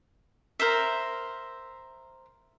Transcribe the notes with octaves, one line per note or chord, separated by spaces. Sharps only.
A#4 C5 E5